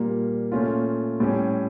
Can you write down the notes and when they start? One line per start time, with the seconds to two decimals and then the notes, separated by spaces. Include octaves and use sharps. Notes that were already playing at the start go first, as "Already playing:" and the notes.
Already playing: A#2 G3 A#3
0.52 A#2 A3 C#4 F4
1.20 A2 G3 C#4 G4